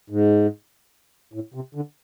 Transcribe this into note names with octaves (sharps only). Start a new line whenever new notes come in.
G#2
A2
C3
D3